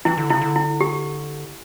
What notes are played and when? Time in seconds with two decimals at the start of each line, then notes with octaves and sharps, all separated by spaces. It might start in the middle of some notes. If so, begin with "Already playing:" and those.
0.05 E3 E4
0.17 D3
0.29 C#3 E4
0.41 D3
0.56 E4
0.81 G4